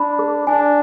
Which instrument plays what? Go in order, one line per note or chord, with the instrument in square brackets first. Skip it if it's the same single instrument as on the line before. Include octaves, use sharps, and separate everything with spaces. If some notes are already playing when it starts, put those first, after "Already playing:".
Already playing: [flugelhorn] D4 [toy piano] B5
[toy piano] G#4
[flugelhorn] D4 [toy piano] G#5